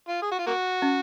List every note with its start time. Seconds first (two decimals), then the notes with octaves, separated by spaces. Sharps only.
0.08 F4
0.22 G#4
0.31 F#4
0.38 F4
0.46 A#3 F#4
0.82 C#4